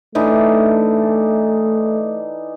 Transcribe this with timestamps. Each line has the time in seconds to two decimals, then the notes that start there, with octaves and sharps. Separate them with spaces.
0.15 E3 A3 D4 D#4